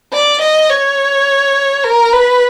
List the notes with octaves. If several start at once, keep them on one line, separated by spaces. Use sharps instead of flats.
D5
D#5
C#5
A#4
B4